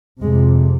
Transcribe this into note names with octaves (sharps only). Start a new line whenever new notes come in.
F2 C3 G#3